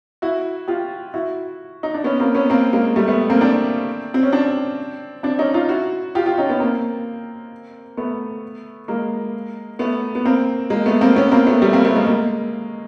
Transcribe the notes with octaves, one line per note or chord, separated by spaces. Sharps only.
E4 F#4
F4 G4
E4 F#4
D#4
D4
B3 C#4
A#3 C4
B3 C#4
A#3 C4
G#3 A#3
G3 A3
A3 B3
A#3 C4
C4 D4
C4
C#4
C4 D4
C4 D4
C#4 D#4
D#4 F4
E4 F#4
F4 G4
F4 G4
C#4 D#4
B3 C#4
A#3 C4
A3 B3
G#3 A#3
A3 B3
B3
A#3 C4
G#3 A#3
A3 B3
A#3 C4
B3 C#4
B3
A#3 C4
A3 B3
G3 A3
A#3 C4
A3 B3
G#3 A#3
G#3 A#3